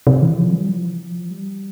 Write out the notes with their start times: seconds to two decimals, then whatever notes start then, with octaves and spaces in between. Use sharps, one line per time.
0.07 C3
0.22 E3
0.37 F3
0.53 G3
0.68 F3
0.89 E3
1.10 F3
1.31 G3